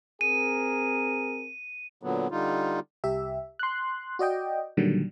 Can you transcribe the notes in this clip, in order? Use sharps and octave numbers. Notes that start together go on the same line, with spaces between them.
C4 G#4 A#4 D#7
A#2 D3 F#3 B3
D3 G3 D#4 F4
C2 G4 E5
C6 F#6
F#4 D5 D#5 G5
A#2 D3 D#3 F#3 G3